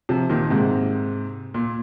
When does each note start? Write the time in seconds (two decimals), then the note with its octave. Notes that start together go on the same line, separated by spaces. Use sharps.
0.09 C3 F3
0.30 A#2 D#3
0.50 G#2 C3
1.54 A#2